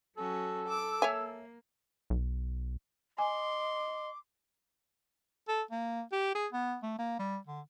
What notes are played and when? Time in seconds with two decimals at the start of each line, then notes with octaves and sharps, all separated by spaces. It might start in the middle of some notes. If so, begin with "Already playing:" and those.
0.18 F#3 C#4 F#4 A4
0.69 D6 E6
1.02 A#3 C#5 E5 G#5
2.10 B1
3.18 D#5 G#5 C6 D6
5.48 A4
5.71 A#3
6.12 G4
6.35 G#4
6.52 B3
6.83 A3
6.98 A#3
7.19 G3
7.47 D3